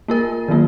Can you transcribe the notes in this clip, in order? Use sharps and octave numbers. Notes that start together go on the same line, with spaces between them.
A#3 F4 A#4
D#3 F#3 A#3 F4